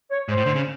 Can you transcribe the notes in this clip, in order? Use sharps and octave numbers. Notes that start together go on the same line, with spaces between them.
C#5
G#2 C5
A2
D3
C#3